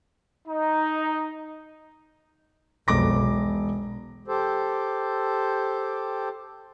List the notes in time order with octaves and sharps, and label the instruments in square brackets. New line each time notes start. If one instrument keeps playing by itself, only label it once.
[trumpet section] D#4
[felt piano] E1 D6 A#6 [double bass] B1 F2
[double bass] B2
[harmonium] G4 A4 C5